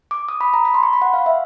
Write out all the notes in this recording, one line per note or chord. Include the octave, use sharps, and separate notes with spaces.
D6
D#6
B5
A#5
B5
C6
C#6
B5
F#5
F5
E5